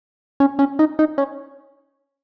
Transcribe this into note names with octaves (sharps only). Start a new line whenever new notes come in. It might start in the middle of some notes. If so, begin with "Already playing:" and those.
C#4
C#4
D#4
D#4
C#4